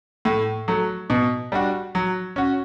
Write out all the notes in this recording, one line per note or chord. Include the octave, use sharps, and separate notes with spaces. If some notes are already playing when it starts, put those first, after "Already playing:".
A2
F#3 A3
B2
G3 D4 F#4
F#3
C#4 F#4